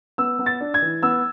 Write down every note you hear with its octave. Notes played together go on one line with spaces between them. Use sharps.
B3 E6
B3
A6
D4
G#6
E3
B3 E6